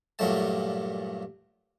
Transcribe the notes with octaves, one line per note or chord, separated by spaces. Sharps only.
G2 A#2 F#3 A3 A5